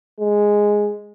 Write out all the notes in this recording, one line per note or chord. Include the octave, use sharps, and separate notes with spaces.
G#3